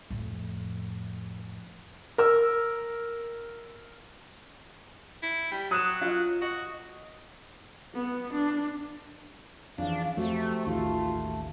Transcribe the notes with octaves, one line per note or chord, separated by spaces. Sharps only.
F2 A2
A#4 E6
E4
G3
F#3 D#6 F#6 E7
F#3 F4 D#5
F#4 D#5
B3
D4
F2 C#3 E3 D4 F5
F2 C3 A3 F#4
A1 D#2 F4